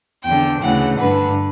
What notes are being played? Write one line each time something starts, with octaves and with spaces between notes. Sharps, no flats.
E2 D3 G5
D2 C#3 E3 F#5
G2 D3 B4